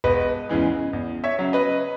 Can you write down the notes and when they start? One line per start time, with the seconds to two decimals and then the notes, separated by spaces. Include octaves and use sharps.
0.04 E1 B4 D#5
0.49 E2 C#3 E3 G#3
0.93 E2
1.24 C#5 E5
1.39 C#3 F#3
1.53 B4 D#5